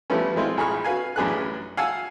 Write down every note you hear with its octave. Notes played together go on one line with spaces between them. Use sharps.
F3 G3 A3 B3 C#4
G#3 C4 E4 F4
A#1 G#4 B5 C#6 F6
F#4 B4 F5 G#5
A1 F#2 D4 G#4 B4 F#6
F5 F#5 G#5 A5 E6